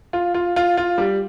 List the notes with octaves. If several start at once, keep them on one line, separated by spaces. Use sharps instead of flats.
F4
F4
F4
F4
G3